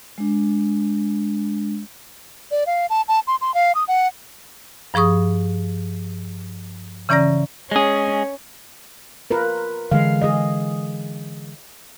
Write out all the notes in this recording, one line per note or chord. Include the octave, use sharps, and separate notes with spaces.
G#3 D4
D5
F5
A5
A5
C6
C6
F5
D#6
F#5
G2 F3 G#4 C#6 D#6
C#3 E3 C#4 D5 A#5 A#6
G#3 C#4 G#4
F4 A#4 B4
D3 E3 G#3 F5
G#4 D#5